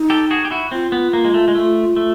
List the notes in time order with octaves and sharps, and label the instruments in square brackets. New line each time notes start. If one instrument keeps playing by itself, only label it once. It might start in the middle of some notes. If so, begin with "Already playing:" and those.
Already playing: [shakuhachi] D#4
[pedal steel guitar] G4 A4
F#4 G#4
G4
E4 F#4
[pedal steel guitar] C4 [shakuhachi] F4
[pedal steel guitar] B3
A#3
G#3
A3
G#3
A3
A3